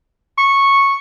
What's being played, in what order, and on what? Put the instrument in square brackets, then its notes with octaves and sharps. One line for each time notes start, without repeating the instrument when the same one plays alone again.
[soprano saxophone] C#6